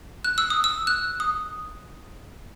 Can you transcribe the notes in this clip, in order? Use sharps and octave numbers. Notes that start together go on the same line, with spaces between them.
F#6
E6
D#6
E6
F#6
D#6